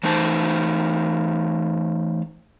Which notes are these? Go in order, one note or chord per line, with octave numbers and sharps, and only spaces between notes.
E3 A3 D#4 C5 A5